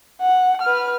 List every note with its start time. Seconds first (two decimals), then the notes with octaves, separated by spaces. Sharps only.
0.21 F#5
0.62 B4 F6